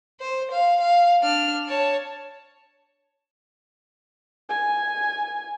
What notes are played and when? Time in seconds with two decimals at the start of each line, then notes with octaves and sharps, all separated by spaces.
0.20 C5
0.51 F5
0.80 F5
1.21 D4 F6
1.68 C#5 A5
4.49 G#5